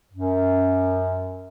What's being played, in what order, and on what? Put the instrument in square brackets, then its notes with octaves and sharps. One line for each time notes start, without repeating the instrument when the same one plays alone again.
[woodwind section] F#2